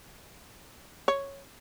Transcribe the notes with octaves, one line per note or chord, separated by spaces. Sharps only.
C#5